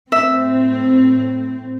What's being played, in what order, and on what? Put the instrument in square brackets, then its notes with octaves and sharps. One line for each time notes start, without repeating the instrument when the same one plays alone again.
[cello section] A2 C4 [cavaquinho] E5